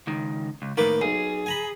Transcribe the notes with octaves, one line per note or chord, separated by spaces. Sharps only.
C#2 D#3
C#2
A2 D#3 A#3 B4 D6
B1 G#4
G#5 A#5 B5